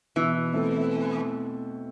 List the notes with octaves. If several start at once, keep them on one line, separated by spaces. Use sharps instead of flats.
B2 E3
A3 C4 E4 A4